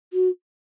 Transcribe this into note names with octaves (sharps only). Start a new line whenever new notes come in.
F#4